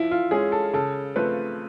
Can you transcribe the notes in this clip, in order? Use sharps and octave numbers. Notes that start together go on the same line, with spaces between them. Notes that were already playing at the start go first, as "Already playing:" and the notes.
Already playing: F3 E4
F4
G#3 C#4 G#4
A4
C#3 A4
F3 A3 C4 B4